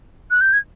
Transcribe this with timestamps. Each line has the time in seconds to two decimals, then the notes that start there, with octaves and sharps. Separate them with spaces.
0.31 F#6
0.41 G6
0.53 G#6